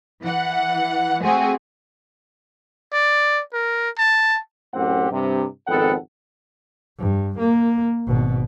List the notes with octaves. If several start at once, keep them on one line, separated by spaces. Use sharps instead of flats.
E3 F#5
A3 C4 F#4 G#4
D5
A#4
A5
F#2 A2 C4 G4 F#5
G2 C3
G#1 F2 B3 A4 F#5 G5
G2
A#3
G#1 B2